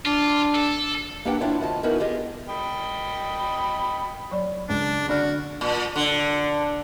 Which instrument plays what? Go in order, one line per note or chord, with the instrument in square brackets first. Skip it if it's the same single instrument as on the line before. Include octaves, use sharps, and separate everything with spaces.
[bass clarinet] D4 [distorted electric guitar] F4
[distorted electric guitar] A4
[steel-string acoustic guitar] A#3 D4 G4 B4 F#5 G5
D4 E4 F4 C#5
D2 F4 D#5 A5
B3 C#4 D#4 E4 F#4 A#4
F4 G4 G#4 D#5
[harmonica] D#5 G5 B5
[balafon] F#3 D5 B5
[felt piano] C#2 [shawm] D4
[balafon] D3 B5 [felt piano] D4 D5 F6 [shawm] F#4
[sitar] A#2
D3